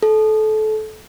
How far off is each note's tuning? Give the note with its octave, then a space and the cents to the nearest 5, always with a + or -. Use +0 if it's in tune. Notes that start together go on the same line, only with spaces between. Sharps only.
A4 -25